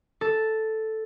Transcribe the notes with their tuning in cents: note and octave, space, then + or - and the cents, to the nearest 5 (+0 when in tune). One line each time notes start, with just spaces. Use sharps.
A4 +0